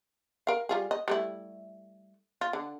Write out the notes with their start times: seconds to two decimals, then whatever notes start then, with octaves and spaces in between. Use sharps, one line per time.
0.47 A#4 F5
0.69 G3 F4 G#4
0.91 D#5
1.08 G3 A3 E4
2.41 F4
2.53 D3